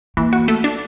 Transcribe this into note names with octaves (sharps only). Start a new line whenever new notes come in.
E3 A#3
F#4
A3
D4